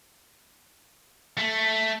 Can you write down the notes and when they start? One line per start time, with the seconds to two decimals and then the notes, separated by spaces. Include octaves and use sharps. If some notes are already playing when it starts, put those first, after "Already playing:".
1.37 A3